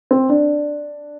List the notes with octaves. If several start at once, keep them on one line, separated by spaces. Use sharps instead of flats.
C4
D4